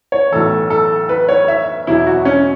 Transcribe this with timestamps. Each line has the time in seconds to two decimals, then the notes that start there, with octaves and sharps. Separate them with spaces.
0.12 C#5
0.32 B1 A2 E3 A4
0.70 A4
1.09 B4
1.29 C#5
1.48 E5
1.87 E2 B2 F#3 E4
2.07 F#4
2.25 C#4